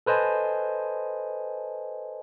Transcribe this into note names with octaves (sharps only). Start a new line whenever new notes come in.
A4 B4 C5 D#5 G#5 A5